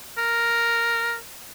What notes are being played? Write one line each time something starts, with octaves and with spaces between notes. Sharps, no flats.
A#4